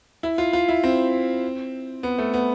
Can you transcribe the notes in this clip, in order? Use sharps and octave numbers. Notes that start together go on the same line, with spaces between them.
E4
F4
F4
E4
C4
B3
A3
B3